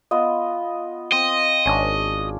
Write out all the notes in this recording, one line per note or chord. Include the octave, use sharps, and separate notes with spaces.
B3 F4 D#5
C4 D#5
G#1 C#4 D4